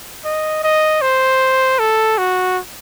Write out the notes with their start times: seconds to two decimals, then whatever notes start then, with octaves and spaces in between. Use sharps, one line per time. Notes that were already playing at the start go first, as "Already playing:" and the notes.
0.25 D#5
0.64 D#5
1.02 C5
1.79 A4
2.18 F#4